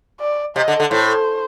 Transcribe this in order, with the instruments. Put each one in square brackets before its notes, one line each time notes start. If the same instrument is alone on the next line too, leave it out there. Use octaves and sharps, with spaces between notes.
[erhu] D5
[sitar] C3 [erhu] D#5
[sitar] D3
D3
[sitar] A2 [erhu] C5